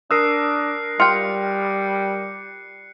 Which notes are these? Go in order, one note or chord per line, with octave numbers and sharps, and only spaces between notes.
D4 A#4 D#6 E6 F#6 C7
G3 F4 G5 C#7